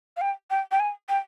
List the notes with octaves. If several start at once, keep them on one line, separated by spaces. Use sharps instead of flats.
F5
G5
G5
G5
G#5
G5